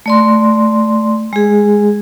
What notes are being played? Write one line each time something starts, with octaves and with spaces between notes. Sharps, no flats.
A3 D5 C6
G#3 G#4